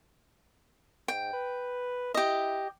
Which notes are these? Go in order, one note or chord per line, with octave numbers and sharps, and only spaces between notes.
G#2 G5
B4
E4 G4 D#5